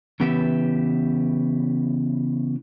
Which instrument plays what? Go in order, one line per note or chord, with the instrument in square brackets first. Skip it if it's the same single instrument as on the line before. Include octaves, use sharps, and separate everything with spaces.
[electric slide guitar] C#3 E3 B3 G4 B4 E5